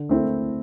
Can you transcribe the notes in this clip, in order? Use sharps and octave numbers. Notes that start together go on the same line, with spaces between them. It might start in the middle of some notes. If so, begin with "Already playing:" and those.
Already playing: D3
A3 C4 E4